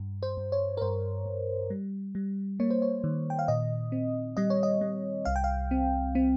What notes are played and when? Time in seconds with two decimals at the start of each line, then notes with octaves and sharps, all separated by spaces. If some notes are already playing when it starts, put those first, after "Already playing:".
Already playing: G2
0.23 C5
0.37 G2
0.52 C#5
0.77 A#4
0.81 G2 C5
1.26 G2
1.70 G3
2.15 G3
2.60 A#3 C#5
2.70 C5
2.82 C#5
3.04 D#3
3.30 G5
3.39 F5
3.48 A#2 D#5
3.92 C4
4.37 G3 D#5
4.50 C#5
4.63 D#5
4.81 G3
5.25 C2 F5
5.36 G5
5.44 F5
5.71 C4
6.15 C4